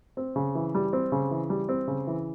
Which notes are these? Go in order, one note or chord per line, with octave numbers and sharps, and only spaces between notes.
C4
C#3
E3
G3
C4
C#3
E3
G3
C4
C#3
E3